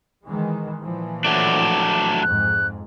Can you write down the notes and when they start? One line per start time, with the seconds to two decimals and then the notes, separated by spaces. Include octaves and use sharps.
0.24 D#3 E3 G#3
0.81 A#2 E3 F3
1.25 F#3 A3 D4 D6
2.23 F2 G#2 F#6